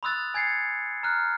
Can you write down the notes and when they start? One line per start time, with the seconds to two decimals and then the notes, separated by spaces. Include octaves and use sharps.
0.03 B5 C6 D#6 E6 F#6 A6
0.34 G#5 G#6 A6 C7 C#7
1.03 A#5 F6 F#6